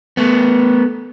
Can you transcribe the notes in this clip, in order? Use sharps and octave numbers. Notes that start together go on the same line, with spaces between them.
A3 B3